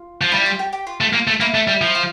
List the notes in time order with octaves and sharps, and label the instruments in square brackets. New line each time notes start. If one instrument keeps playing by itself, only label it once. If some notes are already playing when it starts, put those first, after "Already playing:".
Already playing: [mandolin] F4
[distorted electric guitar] F3
[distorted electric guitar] G3 [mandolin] E4
[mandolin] F4
G4
G4
F4
[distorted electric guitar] A3
A#3
A3
[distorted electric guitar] A#3 [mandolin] E4
[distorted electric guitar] A3
G3
F3
[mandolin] F4